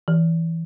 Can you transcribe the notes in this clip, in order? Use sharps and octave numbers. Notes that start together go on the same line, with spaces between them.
E3